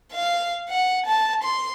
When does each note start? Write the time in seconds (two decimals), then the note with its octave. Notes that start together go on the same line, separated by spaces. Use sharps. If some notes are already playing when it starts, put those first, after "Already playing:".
0.12 F5
0.69 F#5
1.06 A5
1.43 C6